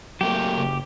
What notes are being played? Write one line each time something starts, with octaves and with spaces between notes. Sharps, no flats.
F#3 A3 A#3 G4
F#1